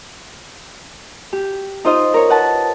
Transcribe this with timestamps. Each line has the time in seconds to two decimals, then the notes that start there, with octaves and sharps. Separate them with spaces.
1.33 G4
1.85 D#4 F4 C5 D#5
2.14 A#4 C#5
2.29 B4 F#5 A5